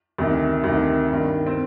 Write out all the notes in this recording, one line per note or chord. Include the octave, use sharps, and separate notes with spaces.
D2 C3 D#3
D2 C3 D#3
G2 D#3
C4